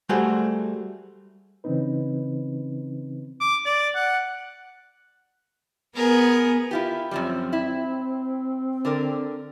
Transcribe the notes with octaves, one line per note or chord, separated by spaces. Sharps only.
G3 A3 F#4 G#4 C5
C#3 E3 C4 C#4 D#4 B4
D6
D5
F#5
B3 G#4 A#4
E4 F4 G4
F#2 F3 G3 C4
E4
D3 A#4 D5